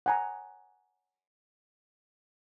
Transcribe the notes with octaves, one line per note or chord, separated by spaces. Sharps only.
F#5 G#5 A#5